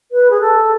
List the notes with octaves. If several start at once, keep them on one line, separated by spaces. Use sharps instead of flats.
B4
G#4
A4